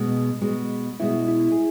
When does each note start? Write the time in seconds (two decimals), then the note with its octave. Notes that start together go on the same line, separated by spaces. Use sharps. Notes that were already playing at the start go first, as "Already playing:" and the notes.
Already playing: B2 G#3 B3 F#4
0.41 B2 G#3 B3 F#4
1.00 B2 G#3 B3 E4 F#4
1.28 E4
1.52 G#4